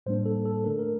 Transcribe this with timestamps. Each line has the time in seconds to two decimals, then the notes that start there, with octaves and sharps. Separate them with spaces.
0.06 A2 G3 A#3 D4 C5
0.26 A4
0.45 A4
0.64 D3 A3 D4 A#4
0.79 A#4